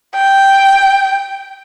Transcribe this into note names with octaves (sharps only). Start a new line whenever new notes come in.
G5